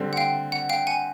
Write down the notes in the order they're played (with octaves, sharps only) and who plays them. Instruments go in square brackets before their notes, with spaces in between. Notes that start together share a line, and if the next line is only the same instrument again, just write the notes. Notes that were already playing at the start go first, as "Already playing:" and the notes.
Already playing: [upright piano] D3 G3 C4
[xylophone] F#5
F5 G5
F#5
F5 G5
F#5 G#5